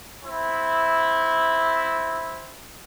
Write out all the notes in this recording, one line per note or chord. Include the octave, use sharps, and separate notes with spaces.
C4 E4